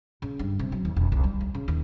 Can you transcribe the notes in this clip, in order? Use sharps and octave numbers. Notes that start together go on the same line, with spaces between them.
C#3
G2
C3
F#3
D#2
E1
C2
G3
D2
C#3
D#2